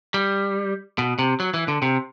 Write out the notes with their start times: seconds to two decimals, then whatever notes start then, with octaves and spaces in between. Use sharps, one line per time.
0.14 G3
0.98 B2
1.19 C3
1.40 F#3
1.54 E3
1.68 D3
1.82 C3